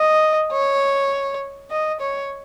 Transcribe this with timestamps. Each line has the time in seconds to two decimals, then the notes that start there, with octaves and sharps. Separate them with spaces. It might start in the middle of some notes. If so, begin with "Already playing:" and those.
Already playing: D#5
0.53 C#5
1.71 D#5
2.00 C#5